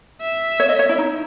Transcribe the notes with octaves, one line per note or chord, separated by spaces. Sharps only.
E5
C#5
D#5
C#5
E4
D#4